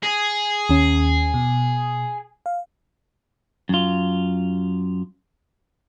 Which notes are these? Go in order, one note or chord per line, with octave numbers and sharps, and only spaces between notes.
G#4
D#2 C#4
B2
F5
F#2 F4